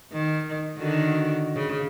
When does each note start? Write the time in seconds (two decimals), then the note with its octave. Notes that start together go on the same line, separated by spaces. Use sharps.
0.12 D#3
0.78 D3 D#3 F#4
1.55 C#3